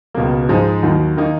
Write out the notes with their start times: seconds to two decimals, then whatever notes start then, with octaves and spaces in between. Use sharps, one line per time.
0.14 C#2 B2 A#3
0.49 G#2 F3 G#3 D#4
0.83 D#2 D#3 F#3
1.17 D#3 A#3 D#4